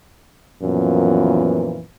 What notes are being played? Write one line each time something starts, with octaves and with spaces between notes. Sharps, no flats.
F#2 A#2 E3 F3 B3